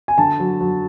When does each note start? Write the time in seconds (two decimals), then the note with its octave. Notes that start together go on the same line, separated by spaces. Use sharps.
0.08 G#5
0.18 D3 A5
0.40 F#3
0.61 F#3